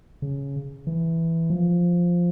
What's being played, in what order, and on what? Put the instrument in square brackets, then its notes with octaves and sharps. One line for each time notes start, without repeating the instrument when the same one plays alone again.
[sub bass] C#3
E3
F3